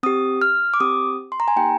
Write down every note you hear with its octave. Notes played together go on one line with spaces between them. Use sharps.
C4 G4 D#6
F6
D6
C4 G4 D#6
C6
A#5
G#5
A#3 D#4 G4 G5